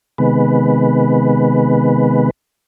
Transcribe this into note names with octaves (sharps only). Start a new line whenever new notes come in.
C3 D#3 G#3 B3 B4